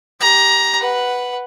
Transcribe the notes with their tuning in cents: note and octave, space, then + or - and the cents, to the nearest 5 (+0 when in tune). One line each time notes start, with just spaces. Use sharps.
G4 +0 A#5 +15
B4 +0 F#5 +0